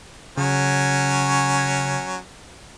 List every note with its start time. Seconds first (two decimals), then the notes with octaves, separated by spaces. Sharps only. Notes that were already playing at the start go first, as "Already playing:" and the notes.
0.38 C#3 F#3 C#4